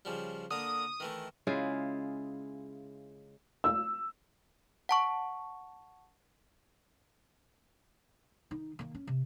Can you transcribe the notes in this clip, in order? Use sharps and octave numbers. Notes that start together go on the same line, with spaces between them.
C#3 F3 G3
D3 A#3 D#6
D#3 E3 A3
C#3 G#3 E4 F4
E6
F#5 A5 C#6
D#3 D#4
D#3 A#3
C#4
C3